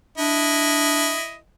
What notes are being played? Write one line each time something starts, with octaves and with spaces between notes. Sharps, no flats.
D4 E4 D#5